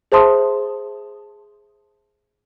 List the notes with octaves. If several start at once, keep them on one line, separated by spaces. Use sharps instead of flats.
G#4 C5 E5 A5 C6 D#6